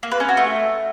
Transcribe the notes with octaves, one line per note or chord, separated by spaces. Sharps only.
A#3
B4
C#4
F#4
A3